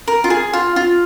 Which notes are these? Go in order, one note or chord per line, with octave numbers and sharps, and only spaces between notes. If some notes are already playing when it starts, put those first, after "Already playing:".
A#4
F4
G#4
F4
F4